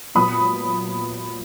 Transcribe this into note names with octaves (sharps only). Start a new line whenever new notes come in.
A#2 F#3 B3 B5 D#6